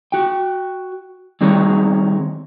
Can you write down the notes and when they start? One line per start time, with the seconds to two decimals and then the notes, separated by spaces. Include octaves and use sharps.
0.12 F#4 G5
1.41 D#3 G3 C4 G#4 A#4 C#5